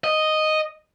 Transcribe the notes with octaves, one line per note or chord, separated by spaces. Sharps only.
D#5